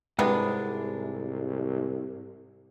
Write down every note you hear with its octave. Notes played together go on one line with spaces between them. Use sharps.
C2 G#2 C3 G#3 B3 D4